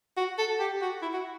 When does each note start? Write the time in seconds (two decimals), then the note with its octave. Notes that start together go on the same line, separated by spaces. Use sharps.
0.17 F#4
0.38 A4
0.59 G4
0.81 F#4
1.02 E4
1.13 F#4